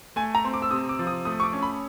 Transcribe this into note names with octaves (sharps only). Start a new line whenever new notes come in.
A3 G#5
A#5
C4
D6
E6
C3 D#6
D6
F3
D#6
A3 D#6
C#6
D6
C#4
B5